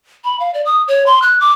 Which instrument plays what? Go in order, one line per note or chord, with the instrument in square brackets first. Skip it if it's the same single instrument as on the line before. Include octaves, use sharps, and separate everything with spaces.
[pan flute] B5
F5
D5
D#6
C#5
C6
F#6
D6